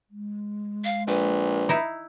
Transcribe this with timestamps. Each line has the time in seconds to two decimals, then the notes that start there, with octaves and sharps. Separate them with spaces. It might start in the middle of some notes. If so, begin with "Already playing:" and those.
0.11 G#3
0.84 F5
1.07 A#1 B4
1.69 D#4 E4